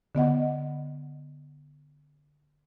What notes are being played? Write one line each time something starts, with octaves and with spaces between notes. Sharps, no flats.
D3 B3 D#5 F#5